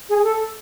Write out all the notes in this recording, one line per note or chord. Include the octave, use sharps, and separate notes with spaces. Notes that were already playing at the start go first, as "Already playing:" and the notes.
G#4
A4